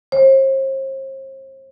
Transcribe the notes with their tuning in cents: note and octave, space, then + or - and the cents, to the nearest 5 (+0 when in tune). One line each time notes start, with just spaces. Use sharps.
C5 +40